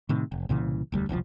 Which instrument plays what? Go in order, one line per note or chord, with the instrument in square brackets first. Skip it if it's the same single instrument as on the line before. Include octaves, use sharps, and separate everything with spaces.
[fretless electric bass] A2 C3 D#3
F1
C2 A#2 C#3 E3
E1 D2 G3
E1 C2 D3 F3